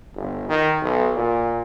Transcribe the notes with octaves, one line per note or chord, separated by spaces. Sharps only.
G1
D#3
B1
A#2